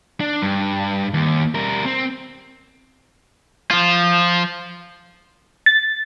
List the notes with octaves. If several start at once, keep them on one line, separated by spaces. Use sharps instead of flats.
D4
G2
D#2
G3 A#4
C4
F3 F4
A6